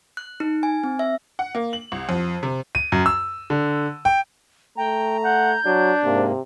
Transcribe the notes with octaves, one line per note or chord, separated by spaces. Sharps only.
F#6
D#4
G#5
C4
E5
F#5
A#3
F#7
C2
F2
C3
D#7
F#2
E6
D3
G5
A3 G5 A#5
F#5 G6
F#3 D4
G#2 C3 A#3